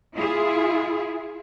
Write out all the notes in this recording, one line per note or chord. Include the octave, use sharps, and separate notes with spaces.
E4 F4 G#4